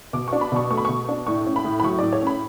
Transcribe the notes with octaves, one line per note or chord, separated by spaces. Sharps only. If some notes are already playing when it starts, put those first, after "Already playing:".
B2 D6
D4 C#6
B5
B2 C#6
A3 C#6
B5
B2 C#6
D4
A2 C#6
C#4
B5
A2
B5
F#3 C#6
A2 D5
C#5
C#4 B5